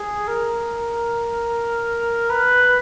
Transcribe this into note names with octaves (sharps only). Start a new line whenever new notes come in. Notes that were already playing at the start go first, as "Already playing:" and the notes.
Already playing: G#4
A#4
B4